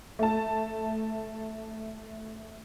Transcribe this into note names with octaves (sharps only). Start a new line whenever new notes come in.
A3 A5